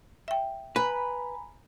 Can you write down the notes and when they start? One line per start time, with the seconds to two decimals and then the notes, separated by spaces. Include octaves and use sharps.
0.28 E5 G5
0.76 B4 G#5 A#5 B5